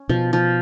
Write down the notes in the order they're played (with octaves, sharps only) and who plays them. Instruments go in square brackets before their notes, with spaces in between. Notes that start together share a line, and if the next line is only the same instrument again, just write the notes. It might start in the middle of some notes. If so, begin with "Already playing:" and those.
Already playing: [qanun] C#4
[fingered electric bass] B2 [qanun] F3
[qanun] F3